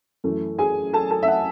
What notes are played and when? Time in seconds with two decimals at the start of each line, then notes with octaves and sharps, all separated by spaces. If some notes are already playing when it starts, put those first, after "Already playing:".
0.24 F#2 E3 A3
0.58 G#4 G#5
0.93 A4 A5
1.11 A4 A5
1.23 E5
1.28 F#5